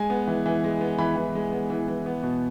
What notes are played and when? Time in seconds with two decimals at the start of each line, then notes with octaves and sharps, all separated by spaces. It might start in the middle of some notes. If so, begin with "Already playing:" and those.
Already playing: G#3 G#5
0.10 B3
0.28 E3
0.46 E3
0.64 G#3
0.81 B3
0.98 E3 B5
1.16 E3
1.35 G#3
1.52 B3
1.70 E3
1.88 E3
2.06 B3
2.23 B2